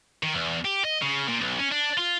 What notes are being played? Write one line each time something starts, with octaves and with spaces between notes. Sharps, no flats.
D#3
E2
G4
D#5
C#3
A#2
B1
C#4
D4
F4